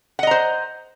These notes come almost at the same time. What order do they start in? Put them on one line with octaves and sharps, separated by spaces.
F#5 D#5 A#5 C5